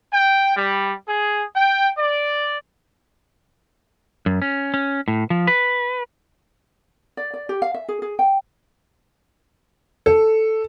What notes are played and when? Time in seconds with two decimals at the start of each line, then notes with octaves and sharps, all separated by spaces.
0.13 G5
0.56 G3
1.07 G#4
1.56 G5
1.97 D5
4.26 F#2
4.42 C#4
4.74 C#4
5.08 A2
5.30 F3
5.47 B4
7.17 D5
7.34 D5
7.49 G4
7.62 F5
7.74 E5
7.88 G#4
8.02 G#4
8.19 G5
10.06 A4